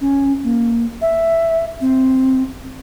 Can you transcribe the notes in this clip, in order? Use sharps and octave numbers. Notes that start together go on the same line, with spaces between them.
C#4
A#3
E5
C4